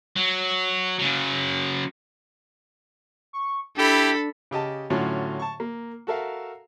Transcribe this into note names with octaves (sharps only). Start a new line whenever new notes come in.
F#3
C#3 F#3
C#6
D4 E4 G4 A4 B5
C#3 G4 D#5 A5
A2 D3 F#3 C#4 F4 F#4
A5 C#6
A#3
F#4 A4 A#4 E5 F5